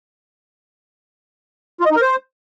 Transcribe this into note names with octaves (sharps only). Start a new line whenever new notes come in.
F4
D#5
D#4
A#4
C5